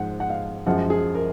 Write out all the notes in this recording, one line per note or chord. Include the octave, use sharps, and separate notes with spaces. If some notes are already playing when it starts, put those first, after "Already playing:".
Already playing: G#2 F3 F#5
F#5
F5
F#2 F3 G#3 F#5
G#4
A#4